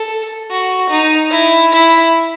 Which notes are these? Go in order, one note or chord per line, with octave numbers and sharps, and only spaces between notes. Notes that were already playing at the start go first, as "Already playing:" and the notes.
Already playing: A4
F#4
D#4
E4
E4